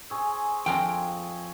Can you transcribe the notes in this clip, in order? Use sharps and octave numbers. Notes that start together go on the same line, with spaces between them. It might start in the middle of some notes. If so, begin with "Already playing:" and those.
G#4 C5 G#5 C#6 E6
F2 F4 G5 G#5 A#5